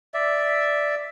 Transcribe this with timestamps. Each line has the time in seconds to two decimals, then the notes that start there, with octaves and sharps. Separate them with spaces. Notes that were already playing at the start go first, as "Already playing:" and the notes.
0.14 D5 E5